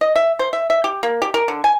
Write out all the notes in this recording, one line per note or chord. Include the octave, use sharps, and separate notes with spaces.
D#5
E5
C5
E5
E5
G4
A#3
G4
A#4
D3
G#5